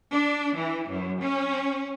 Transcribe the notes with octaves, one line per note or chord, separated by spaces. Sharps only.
D4
E3
F#2
C#4